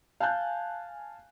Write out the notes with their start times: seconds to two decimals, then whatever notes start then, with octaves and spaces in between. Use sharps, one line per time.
0.20 F5 G#5 A5 F#6 G6